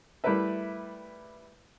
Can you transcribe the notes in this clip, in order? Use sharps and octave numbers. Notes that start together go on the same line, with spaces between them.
G3 A3 E4 A#4 B4 E5